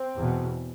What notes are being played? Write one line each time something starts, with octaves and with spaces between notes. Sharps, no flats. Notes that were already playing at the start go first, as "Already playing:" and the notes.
Already playing: C4
E2 B2